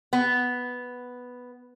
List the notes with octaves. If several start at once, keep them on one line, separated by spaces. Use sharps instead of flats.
B3